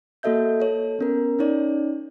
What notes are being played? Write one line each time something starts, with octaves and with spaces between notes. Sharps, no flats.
A#3 F#4 A4 D#5 E5 G6
A4 C#5
B3 C#4 A#4
C#4 D#4 C#5 D5